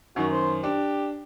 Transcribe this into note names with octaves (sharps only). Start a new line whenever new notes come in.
F#2 D#3 F#4
C5
D4 G4